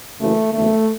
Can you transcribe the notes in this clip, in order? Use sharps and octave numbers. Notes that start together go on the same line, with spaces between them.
F#1 F#2 C#3 E3 A3
F#1 E2 D3 A3